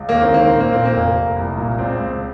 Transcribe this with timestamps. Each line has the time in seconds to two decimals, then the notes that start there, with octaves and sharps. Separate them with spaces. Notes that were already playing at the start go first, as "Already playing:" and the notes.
Already playing: C#2
0.09 D#2 A#3
0.22 C4
0.30 D#3 A#3
0.48 A#1 C4
0.60 A#3
0.72 A#2 C4
0.85 A#3
0.94 F1
1.15 F1
1.37 C2
1.57 A#2
1.78 C#2 C4
1.99 C#2